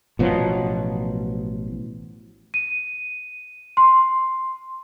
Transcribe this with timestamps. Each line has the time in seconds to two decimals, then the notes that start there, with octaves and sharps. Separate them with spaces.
0.19 A1 B2 F3 F#3
2.54 D#7
3.77 C6